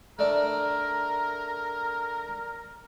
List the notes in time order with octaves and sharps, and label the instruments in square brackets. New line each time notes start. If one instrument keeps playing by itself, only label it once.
[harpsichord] A3 D4 D5 [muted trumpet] A#4